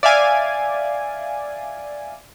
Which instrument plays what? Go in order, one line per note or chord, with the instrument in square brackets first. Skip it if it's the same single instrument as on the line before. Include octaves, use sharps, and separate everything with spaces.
[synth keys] D5 E5 F5 G#5